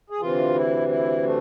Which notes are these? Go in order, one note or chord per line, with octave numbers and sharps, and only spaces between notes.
G#4
D2 C3 E3 F4
E4
E4
A3